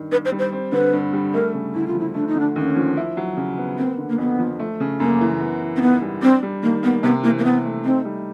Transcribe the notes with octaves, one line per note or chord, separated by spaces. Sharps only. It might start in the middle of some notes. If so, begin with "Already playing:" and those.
Already playing: G2 D#3
G2 B4
C5
G3
C5
C4
D3 B4
G2
G3
A3 A#4
C#3
D2 E4
F4
F3 E4
A3 D4
D#4
D3 D4
D#2 C#4
F3
E4
F#3
C#3
B3
A#3 C4
D3
A#3
F2 B3
F3
A3
C#3
F#2 A#3
E3
B3
E3
C4
G#2 B3
G3
C4 D4
G3
D#3 A#3
A#3 B3
C3 B3
E3 A#3
A#3
C3 B3
A3
C4 D#4
G3